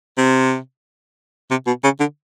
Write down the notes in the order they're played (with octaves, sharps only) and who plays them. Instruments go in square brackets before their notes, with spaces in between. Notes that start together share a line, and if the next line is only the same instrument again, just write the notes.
[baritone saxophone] C3
C3
B2
C#3
D3